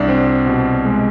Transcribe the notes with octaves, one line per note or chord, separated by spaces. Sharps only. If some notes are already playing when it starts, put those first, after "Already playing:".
Already playing: C2 D4
C4
B2
G#3